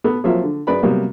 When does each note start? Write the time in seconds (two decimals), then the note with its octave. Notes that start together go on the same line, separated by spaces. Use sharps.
0.04 B3 A4 B5
0.24 F3 F#3 A#3 C4 F4 E5
0.43 D3
0.67 F#2 G#4 B4 D5 B5
0.83 C3 F#3 G3 A#3 B3